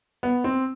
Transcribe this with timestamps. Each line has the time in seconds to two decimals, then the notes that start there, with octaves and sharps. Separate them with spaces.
0.23 B3
0.44 C4